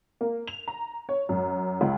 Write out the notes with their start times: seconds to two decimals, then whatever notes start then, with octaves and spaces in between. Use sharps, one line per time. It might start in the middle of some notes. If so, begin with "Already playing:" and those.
0.21 A#3
0.47 F7
0.68 A#5
1.09 C#5
1.29 F#2
1.81 C#2